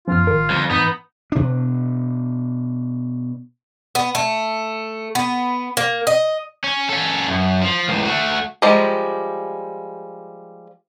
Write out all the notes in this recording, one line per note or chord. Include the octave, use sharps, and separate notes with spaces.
F#2 F3 B3 C#4 F4 F6
A1 D#3 A#4
F2 D3 G3
G#2 E3 B3 D#4
B2 D4
B3
A3
B3
A#3
D#5
C#4
C#4 A4
F#2
F3
C#2 A2
A3 F#4
F3 G3 G#3 G4 A#5